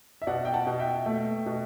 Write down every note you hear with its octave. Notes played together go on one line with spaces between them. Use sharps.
E5
B2 D5 F#5
G5
F#5 A5
B2
E5 G5
A3
B2